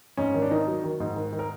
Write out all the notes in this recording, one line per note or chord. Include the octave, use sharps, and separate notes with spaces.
G#2 C#4
D#3
D4
D#3 D#4
F#3
D#3
G#2
D#3
D#3
A#4